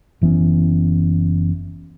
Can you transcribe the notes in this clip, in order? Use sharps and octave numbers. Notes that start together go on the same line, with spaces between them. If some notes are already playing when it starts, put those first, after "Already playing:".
F#1 E3 B3 C#4